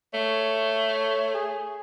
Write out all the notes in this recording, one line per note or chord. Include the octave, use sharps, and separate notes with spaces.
A3 C#5
G#4